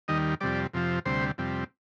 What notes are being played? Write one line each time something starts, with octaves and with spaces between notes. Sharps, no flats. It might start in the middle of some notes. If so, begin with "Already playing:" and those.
D#2 D#3 G3 D#5
F2 C3 G3 D5
F2 C3 F3
D2 C3 G3 C5
F2 C3 G3